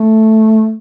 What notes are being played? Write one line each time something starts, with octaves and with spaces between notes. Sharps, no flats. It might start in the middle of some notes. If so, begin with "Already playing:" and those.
Already playing: A3